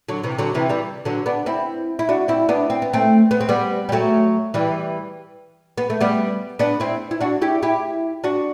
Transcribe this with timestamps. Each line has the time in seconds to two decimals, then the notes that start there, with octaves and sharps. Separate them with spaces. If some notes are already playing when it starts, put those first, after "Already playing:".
0.09 D3 F#3
0.23 C3 E3
0.38 D3 F#3
0.55 C3 E3
0.69 E3 G3
1.05 D3 F#3
1.26 B3 D4
1.46 C4 E4
1.99 E4
2.09 D4 F#4
2.28 C4 E4
2.49 B3 D4
2.70 C4
2.82 B3
2.93 A3 C4
3.31 B3
3.41 C4
3.49 G3 B3
3.89 G3
3.92 F#3 A3
4.54 E3 G3
5.78 B3
5.90 A3
6.01 G3 B3
6.59 B3 D4
6.80 C4 E4
7.11 E4
7.20 D4 F#4
7.42 E4 G4
7.62 E4 G4
8.24 D4 F#4